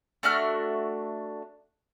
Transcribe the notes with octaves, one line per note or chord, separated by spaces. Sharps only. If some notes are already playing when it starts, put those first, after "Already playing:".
A3 D4 F#4 F6